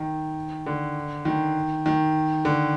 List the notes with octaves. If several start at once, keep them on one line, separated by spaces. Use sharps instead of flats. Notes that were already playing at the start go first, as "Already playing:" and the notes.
Already playing: D#3
D3
D#3
D#3
D3